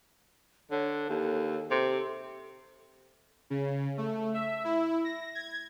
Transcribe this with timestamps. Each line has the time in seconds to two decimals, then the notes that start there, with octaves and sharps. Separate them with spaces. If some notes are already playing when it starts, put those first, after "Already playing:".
0.71 D3 C#5
1.09 D#2 A4
1.71 C3 A4
3.50 C#3
3.98 A3
4.34 E5
4.64 E4
5.04 A#6
5.35 G#6